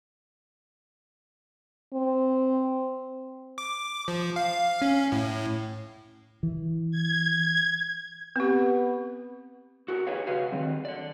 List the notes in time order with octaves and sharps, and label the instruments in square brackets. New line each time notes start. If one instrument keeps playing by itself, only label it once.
[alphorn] C4
[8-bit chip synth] D6
F3
F5
C#4
A2
[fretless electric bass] E3
[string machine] G#6
[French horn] B3 [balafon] C4 G4
[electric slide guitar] F#4 A4 A#4
D#4 G4 G#4 B4 C#5 F5
C#3 F#4 G#4 B4 F5
D#3 F#3 G3 C4
A4 D5